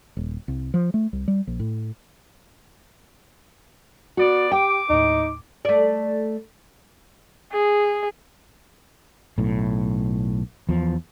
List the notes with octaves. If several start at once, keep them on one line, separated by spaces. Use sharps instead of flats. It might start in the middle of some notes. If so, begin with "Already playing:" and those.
D#1
C2
F3
A3
C2
G3
A#1
A2
B3 F#4 D5
G4 G5 D6
D#2 A2 D#4
A3 D5
G#4
B1 A2
E2 F3